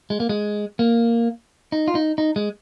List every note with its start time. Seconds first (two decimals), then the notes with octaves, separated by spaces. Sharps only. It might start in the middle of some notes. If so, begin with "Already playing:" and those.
0.10 G#3
0.20 A#3
0.29 G#3
0.79 A#3
1.72 D#4
1.88 F4
1.95 D#4
2.18 D#4
2.36 G#3